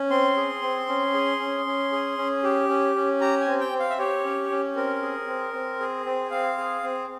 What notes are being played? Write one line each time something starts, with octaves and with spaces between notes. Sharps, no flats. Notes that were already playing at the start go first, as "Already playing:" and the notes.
Already playing: C#4
C4 C6
G#4
C4
C#4
G#4
C#4
C#4
G#4
C#4
G4
C#4
C#4
G4 A#5
G#5
C4
G5
C4
F5
E5
G4 C#5
C#4
C#4
C4 A#4
G#4
C4
C4
G#4
C4
C4 F5
G#4
C4